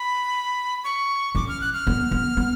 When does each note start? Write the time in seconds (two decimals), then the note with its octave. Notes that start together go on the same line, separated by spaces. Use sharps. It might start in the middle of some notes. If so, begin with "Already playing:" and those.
Already playing: B5
0.84 C#6
1.35 C#4 D6
1.49 F6
1.61 F#6
1.74 F6
1.87 B3
2.11 B3
2.37 B3